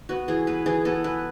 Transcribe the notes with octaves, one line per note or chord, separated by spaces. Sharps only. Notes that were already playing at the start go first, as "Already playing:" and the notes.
B3 F#4
E3 G#4
B3 B4
E3 G#4
B3 A4
E3 B4